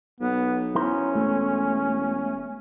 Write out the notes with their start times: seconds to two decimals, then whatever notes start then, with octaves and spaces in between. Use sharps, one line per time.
0.20 B1 B3
0.75 C#4 E4 A#4 C5
1.15 E1 A3